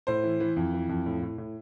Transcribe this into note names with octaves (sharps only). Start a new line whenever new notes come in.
A2 C5
E3
E3
F2
E3
F2
A2
A2
A2